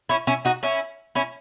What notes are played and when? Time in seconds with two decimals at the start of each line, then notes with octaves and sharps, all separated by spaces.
0.09 C#4 E4
0.27 C#4 E4
0.45 D#4 F#4
0.63 C#4 E4
1.15 C#4 E4